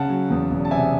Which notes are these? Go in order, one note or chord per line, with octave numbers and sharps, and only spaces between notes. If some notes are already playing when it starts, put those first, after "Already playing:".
Already playing: C#3 F#5 A5
F#3
E2
E1
A5
C3 E5 G#5